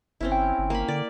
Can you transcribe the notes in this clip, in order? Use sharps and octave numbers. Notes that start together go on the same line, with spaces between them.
G1 C4 C#4 E4
G5
G1
A#3 B5
D3 D5